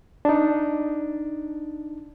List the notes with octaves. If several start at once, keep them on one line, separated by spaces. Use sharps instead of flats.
D4 D#4